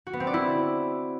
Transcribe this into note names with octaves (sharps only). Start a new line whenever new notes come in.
F#4
B3
C4
D5
E4